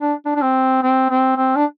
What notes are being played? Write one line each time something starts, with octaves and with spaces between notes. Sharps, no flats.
D4
D4
D4
C4
C4
C4
C4
D4